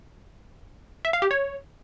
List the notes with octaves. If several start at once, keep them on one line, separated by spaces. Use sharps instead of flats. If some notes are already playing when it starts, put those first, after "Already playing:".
E5
F5
G4
C#5